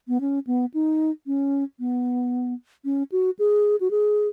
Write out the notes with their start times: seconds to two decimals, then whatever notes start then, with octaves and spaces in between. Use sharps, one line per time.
0.08 B3
0.21 C#4
0.47 B3
0.74 D#4
1.27 C#4
1.80 B3
2.85 C#4
3.12 F#4
3.39 G#4
3.81 F#4
3.91 G#4